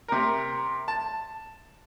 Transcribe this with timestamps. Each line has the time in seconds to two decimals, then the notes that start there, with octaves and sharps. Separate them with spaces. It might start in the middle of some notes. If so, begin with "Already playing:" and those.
0.08 C3 A#4
0.88 A5